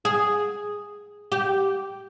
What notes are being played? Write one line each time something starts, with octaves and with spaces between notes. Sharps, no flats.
G#4
G4